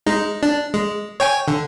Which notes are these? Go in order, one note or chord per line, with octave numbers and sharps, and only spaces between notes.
G#3 D#4
D4
G#3
C#5 G5 G#5
D3